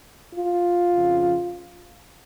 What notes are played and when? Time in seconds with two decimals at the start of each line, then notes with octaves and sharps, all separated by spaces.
0.35 F4
0.93 F2 C#3 F3